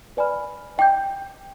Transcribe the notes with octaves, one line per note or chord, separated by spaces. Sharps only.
B4 D5 G#5 B5 F6
D#5 G5 D6 G6